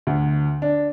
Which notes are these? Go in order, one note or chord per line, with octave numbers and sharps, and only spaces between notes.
D2
D4